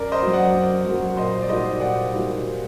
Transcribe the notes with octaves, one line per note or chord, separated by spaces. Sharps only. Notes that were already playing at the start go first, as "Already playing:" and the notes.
Already playing: F#2 A#4 D5
C5 D#5
F#3 A#3 F#4
D5 F#5
F#2
F#3 A#3 F#4
A#2 C5 D#5
D5
G3 A#3 D#4 F#4 C5 D#5
A#2 D5 F#5
G3 A#3 D#4 F#4